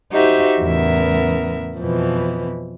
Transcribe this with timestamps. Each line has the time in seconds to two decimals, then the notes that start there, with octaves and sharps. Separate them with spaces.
0.12 D#4 F#4 G4 C5 E5
0.61 E2 A2 C#3 B3 A#4 E5
1.78 F2 B2 E3 F3